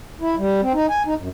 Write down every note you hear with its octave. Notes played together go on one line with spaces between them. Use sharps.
E4
G3
C4
D#4
G#5
D#4
F#2